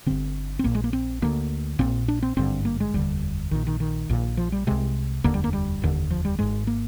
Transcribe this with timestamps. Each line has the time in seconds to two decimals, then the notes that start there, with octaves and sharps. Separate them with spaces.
0.06 G1 G2 D3 C4
0.59 C4
0.64 A#1 A#2 A#3
0.75 G#3
0.84 A#3
0.93 C4
1.22 D2 D3 A#3
1.79 A#1 A#2 C4
2.08 D4
2.22 C4
2.37 G#1 G2 D3 C4
2.65 A#3
2.80 G#3
2.94 F1 D#2 D3 G3
3.51 A#1 A#2 D#3
3.67 D#3
3.80 D#3
4.09 A#1 A#2
4.37 F3
4.52 G3
4.67 C2 C3 G#3
5.24 F1 D#2 D3 A#3
5.34 G3
5.44 A#3
5.53 G3
5.82 F1 D#2 D3
6.10 F3
6.25 G3
6.39 G#1 G#2 G#3
6.67 A#3